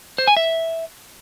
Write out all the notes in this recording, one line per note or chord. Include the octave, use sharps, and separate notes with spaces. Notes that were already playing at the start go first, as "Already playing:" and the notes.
C5
G#5
E5